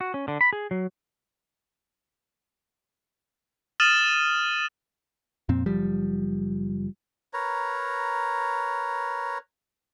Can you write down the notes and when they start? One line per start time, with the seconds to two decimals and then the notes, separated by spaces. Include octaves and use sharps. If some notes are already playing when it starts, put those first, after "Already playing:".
0.01 F#4
0.14 C#4
0.28 D3
0.41 B5
0.53 G#4
0.71 F#3
3.80 D#6 F6 A6 D#7 E7 F#7
5.49 F2 A#2 C4
5.66 F#1 F3 G3
7.33 A#4 B4 C#5 A#5